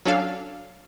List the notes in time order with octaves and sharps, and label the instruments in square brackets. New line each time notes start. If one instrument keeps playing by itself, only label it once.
[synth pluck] F#3 C#4 D4 A4 F5